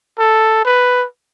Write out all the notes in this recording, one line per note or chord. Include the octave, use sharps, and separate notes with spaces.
A4
B4